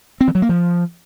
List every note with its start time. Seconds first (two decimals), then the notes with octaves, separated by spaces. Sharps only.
0.21 C4
0.28 E3
0.35 F#3
0.42 A#3
0.49 F3